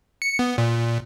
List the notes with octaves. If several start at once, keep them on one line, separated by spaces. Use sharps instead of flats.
C#7
B3
A#2